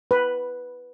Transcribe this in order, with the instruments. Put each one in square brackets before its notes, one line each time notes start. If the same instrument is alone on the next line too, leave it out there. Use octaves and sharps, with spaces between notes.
[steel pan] B4